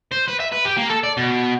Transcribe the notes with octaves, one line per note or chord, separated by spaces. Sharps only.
C5
B4
E5
B4
G4
A#3
A4
D5
B2